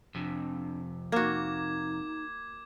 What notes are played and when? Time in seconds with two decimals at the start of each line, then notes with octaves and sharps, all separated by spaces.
0.15 F2 C3 D4
1.12 A#3 D#4 F#4 D6 G#6